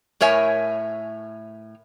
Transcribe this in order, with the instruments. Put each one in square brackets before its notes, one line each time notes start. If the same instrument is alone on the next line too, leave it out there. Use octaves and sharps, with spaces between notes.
[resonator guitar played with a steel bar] A2 A#4 C#5 E5 G#5